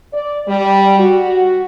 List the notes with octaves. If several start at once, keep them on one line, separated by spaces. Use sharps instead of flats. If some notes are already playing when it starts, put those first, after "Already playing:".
D5
G3
F#4